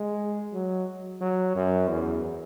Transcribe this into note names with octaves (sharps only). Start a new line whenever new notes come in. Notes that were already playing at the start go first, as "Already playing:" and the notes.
Already playing: G#3
F#3
F#3
F#2
E2